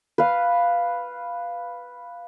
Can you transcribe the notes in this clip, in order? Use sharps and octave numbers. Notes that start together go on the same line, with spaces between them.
B4 F5